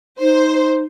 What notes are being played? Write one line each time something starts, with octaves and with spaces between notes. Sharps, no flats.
D#4 C5